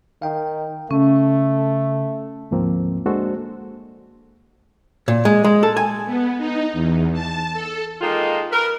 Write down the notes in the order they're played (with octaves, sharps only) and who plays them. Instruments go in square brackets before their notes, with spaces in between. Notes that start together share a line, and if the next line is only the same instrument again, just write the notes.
[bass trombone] D#3 [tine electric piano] F5 G5
[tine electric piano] C#3 [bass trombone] A3 [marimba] C#4
[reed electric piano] D2 G#2 F3 A#3 C4
G#3 A#3 D4 F#4 A4 C5
[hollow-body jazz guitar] A#2
G#3
G#3
A4
G#5
[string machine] B3
D#4
E2
A5
A4
[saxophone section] D#3 G#3 A#3 D#4 F4 A4
A#4 B4